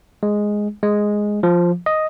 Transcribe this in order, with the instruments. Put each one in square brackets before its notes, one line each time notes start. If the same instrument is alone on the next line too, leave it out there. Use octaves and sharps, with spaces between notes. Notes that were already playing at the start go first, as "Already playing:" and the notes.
[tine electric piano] G#3
G#3
F3
D#5